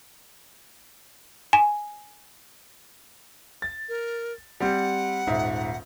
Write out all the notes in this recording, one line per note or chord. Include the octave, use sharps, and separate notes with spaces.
G#5
A6
A#4
G3 C4 F#5
D#1 G#2 E5